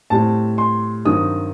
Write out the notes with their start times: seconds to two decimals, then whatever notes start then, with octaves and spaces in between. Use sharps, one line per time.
0.10 A2 G3 C4 A5
0.58 C6
1.05 G2 D#3 F#3 C4 D#6